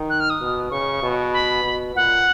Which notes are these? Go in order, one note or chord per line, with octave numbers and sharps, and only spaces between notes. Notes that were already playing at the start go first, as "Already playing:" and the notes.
Already playing: D#3
F#6
F6
D#6
B2
C#3 C#6
B2
B5
B2
A#2 F#5